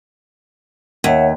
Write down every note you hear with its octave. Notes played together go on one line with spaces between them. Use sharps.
D#2 C#5 E5 F#5